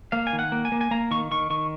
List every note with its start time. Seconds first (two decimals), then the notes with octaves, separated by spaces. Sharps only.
0.12 A#3 F5
0.27 G#5
0.33 D#3
0.39 F#5
0.52 A#3
0.65 G#5
0.72 A#3
0.81 G#5
0.91 A#3 A#5
1.11 D#3 C#6
1.31 D#3 C#6
1.50 D#3 C#6